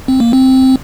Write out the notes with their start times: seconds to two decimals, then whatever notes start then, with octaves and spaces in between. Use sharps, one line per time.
0.08 C4
0.20 A#3
0.33 C4